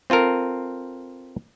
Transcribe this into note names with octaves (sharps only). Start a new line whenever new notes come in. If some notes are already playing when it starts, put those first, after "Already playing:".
C4 F4 A4 A#4